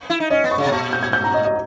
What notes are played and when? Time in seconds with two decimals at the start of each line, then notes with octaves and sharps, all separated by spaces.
0.10 E4
0.20 D#4
0.30 C#4 D#5
0.44 B3
0.51 C#6
0.58 C#3
0.66 B2
0.72 A#2 C#6
0.93 G6
1.03 G#6
1.13 G6
1.24 A#5
1.34 D#5
1.45 D#5